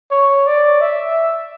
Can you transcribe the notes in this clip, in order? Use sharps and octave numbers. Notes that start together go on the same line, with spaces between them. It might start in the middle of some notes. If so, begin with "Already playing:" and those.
C#5
D5
E5